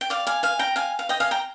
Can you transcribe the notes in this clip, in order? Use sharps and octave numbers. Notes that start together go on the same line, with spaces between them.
G5
D5 F5
F5 G#5
F5 G#5
G5 A#5
F5 G#5
F5
D#5 G5
F5 G#5
G5 A#5